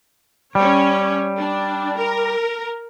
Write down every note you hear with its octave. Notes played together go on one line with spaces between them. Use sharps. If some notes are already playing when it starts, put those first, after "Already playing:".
G3 C#4 C#5
D4
A#4